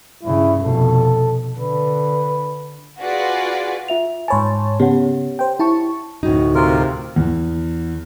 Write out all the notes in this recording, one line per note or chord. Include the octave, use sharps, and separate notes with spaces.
G2 C#3 E4
F1 B2 A4
D3 B4
F4 F#4 G#4 B4 D5
F4 E5 F7
G#2 C#5 G#5 A5 B5 C6
C#3 B3 G4 C#5 F#5
C5 G5
E4 A5 C#6
D2 A2 D#4 F#4
C3 F4 A#4
E2